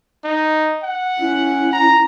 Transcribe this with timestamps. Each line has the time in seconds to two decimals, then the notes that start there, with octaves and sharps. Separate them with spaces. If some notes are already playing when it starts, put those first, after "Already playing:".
0.24 D#4
0.83 F#5
1.19 C#4 E4
1.73 A#5